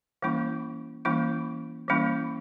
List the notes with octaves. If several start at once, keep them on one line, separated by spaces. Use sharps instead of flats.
E3 G3 A#3 C#4 E4
E3 G3 A#3 C#4 E4
E3 G3 A#3 C#4 E4